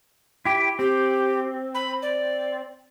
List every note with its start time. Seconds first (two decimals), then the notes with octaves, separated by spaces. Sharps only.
0.45 E4 G4 G5
0.79 C4 G4
1.75 B5
2.02 D5